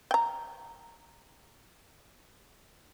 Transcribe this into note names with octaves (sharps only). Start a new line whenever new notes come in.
G5 A#5